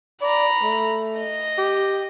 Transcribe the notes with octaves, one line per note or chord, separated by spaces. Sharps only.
D5 A#5 B5
A3
D#5
G4